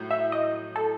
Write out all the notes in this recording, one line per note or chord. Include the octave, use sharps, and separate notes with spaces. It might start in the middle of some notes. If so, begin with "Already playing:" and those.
Already playing: A2 F#3
E5
D#5
A4